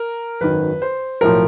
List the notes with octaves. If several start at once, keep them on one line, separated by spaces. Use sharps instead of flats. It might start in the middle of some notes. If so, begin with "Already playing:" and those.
Already playing: A#4
G#1 F#2 D#3 B4
C5
B1 A2 F3 A#4